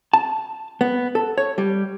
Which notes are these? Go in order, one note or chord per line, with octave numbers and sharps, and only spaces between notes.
A5
B3
A4
C#5
G3